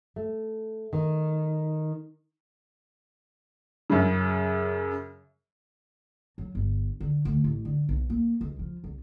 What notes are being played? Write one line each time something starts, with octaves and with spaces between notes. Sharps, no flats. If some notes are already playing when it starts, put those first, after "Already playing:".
A3
D#3
F#2 C#3
F#3
G1
D3
D2
A1
D3
B1
A#3
C#2
F3
C2